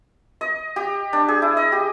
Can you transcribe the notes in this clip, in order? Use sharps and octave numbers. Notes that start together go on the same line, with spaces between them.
D#5
G4
D4
G#4
E4
D#5
G4